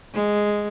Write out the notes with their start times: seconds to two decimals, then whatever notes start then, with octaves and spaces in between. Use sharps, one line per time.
0.13 G#3